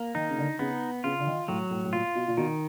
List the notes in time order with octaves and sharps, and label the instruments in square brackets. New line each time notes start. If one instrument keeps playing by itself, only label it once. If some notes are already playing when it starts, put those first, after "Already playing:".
Already playing: [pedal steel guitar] A#3
[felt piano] D#3 [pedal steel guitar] D#4
[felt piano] C#3
D3
[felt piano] C#3 [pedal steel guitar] B3
[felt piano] C#3 [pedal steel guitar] F4
[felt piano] D3
D#3
[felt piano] A2 [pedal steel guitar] F#3
[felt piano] A2
A2
[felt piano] A#2 [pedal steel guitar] F4
[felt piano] B2
A#2
[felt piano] B2 [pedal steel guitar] D#3